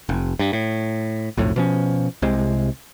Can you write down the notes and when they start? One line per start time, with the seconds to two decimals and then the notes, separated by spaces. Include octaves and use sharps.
0.09 F1
0.39 G2
0.53 A2
1.37 B1 F2 A2
1.56 B2 F3 C#4
2.22 C2 C3 G#3